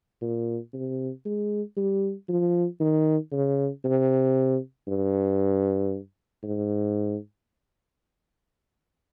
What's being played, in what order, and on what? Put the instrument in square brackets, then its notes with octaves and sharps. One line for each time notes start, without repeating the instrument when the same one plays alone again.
[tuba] A#2
C3
G#3
G3
F3
D#3
C#3
C3
G2
G#2